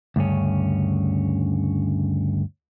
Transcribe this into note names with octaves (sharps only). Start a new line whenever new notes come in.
D2 G2 C#3 C#4